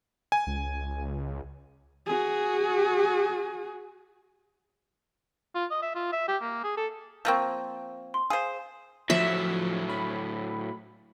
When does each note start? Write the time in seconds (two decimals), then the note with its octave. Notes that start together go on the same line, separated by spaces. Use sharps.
0.32 G#5
0.47 C#2
2.07 F#4 G#4
5.55 F4
5.70 D#5
5.82 E5
5.95 F4
6.13 E5
6.28 G4
6.41 A#3
6.64 G#4
6.77 A4
7.25 F3 A#3 C4 C#6 G6
8.14 C6
8.30 G#4 C5 F5 C7
9.10 A2 F3 F#3 E5
9.89 B5